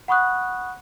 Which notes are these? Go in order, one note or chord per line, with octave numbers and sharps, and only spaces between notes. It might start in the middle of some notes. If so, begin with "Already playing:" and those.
F#5 B5 C#6 D#6 F#6